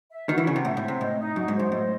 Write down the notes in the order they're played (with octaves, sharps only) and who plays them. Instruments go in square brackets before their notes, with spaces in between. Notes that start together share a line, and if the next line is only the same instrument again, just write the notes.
[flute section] E5
[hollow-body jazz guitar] D#3 [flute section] F#4
[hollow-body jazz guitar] E3
[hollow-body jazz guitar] C#3 [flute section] F#5
[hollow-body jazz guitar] C3
[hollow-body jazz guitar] A2 [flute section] E5
[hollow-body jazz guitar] A2
[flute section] C5
[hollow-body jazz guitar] C3
[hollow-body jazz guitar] A2 [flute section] D#5
[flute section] D#4
[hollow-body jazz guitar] F#2 [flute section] F#4
[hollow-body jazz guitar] G#2
[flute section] C5
[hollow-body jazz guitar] F#2
[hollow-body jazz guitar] A2 [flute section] D#5